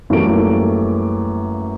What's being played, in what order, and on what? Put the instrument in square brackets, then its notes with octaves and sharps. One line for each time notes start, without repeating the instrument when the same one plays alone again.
[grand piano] F#2 E3 G3 A3 A#3 D7